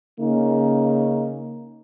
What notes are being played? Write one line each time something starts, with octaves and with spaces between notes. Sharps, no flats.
C#3 A#3 C#4 D#4